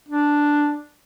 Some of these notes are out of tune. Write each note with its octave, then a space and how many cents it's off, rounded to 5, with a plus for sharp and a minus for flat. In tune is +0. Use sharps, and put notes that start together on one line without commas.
D4 +0